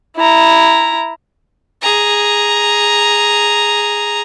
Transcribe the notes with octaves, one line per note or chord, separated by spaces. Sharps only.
E4 A#5
G#4 A#5